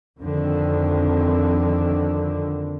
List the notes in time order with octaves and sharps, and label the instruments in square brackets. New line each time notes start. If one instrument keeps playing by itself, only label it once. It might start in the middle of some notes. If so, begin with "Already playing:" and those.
[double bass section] F2 D3 D#3